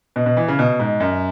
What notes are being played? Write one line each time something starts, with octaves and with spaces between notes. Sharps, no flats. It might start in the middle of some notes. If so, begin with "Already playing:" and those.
B2
B2
E3
C#3
B2
G#2
F#2